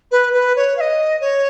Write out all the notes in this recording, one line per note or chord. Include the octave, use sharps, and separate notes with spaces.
B4
B4
C#5
F5
D#5
C#5